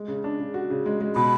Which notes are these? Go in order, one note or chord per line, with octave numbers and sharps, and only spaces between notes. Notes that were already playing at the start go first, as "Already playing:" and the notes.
Already playing: G#3
C#3
D4
C#3
F#4
C#3
G#3
G#3
B2 B5